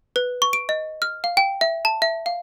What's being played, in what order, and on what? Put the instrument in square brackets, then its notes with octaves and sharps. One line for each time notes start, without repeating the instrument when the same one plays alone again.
[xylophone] B4
C#6
D7
D#5
F6
F5
G5
E5
A5
E5
F5